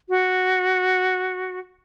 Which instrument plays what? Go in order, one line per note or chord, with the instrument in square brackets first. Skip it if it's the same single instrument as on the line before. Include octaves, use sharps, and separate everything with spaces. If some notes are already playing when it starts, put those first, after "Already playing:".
[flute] F#4